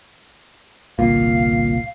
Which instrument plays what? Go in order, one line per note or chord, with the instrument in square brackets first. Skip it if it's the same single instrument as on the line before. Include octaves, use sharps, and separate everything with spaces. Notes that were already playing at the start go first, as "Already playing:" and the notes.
[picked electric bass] G1 C2 A#2 [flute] F5